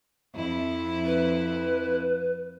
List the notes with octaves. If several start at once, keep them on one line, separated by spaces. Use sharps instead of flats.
F2 E4
B4